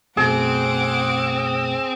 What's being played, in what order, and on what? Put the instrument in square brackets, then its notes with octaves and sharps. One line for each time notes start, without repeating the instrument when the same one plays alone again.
[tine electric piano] F#2 B2 A3 [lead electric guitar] C4 [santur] G#4 [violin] F#5 D6